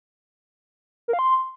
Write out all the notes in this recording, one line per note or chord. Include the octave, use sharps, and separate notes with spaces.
A#4
F5
C6